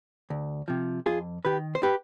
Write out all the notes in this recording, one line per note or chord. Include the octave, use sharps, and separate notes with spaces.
D2
C3 F3
F2 F4 G#4
D#3 G4 B4
C5
G4 B4